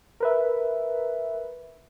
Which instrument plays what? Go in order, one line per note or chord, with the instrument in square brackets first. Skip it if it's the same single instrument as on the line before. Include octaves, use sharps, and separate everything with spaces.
[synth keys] A#4 B4 E5